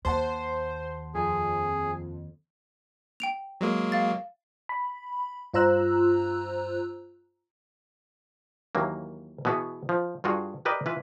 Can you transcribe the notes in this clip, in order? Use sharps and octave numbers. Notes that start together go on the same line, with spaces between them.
D#2 C5 F#5 A5 C6
F2 G#4
G5 D7 F7
F#3 G#3 A#3
F5 A6
B5
G2 F4 C5 A#5 E6 F#6
D#2 E3 F#3 A#3
B2 E3 B3 F#4 G#4
F3
G2 F4 F#4 G#4
G4 A#4 B4 D5 D#5 G5
E3 F4 B4 E5